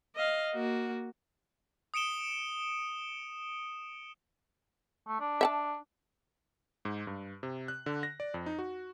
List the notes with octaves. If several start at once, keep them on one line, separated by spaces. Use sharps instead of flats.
D#5 F5
A#3 F#4
D#6 C#7 D7 E7 G7
A3
D4
E5 F#5 A5
G#2
G2
C3
F#6
D3
A#6
D5
F2
D#4
F#4